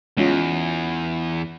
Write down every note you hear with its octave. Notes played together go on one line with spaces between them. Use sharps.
E2 G#3 C#4 F4